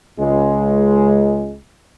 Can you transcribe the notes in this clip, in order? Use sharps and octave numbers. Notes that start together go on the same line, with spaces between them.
C#2 G#3